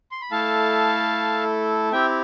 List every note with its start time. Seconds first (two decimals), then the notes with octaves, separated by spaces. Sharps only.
0.11 C6
0.22 B5
0.31 A3 E4 A4 F5 A5
1.92 C4 E4 G4 E5 G5